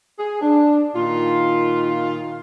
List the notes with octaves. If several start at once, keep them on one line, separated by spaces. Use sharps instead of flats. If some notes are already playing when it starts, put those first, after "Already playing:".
G#4
D4
A#2 D#3 F4